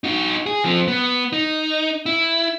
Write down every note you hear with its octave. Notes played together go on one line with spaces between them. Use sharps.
D#4 F#4
G#4
F3 C4
B3
D#4
E4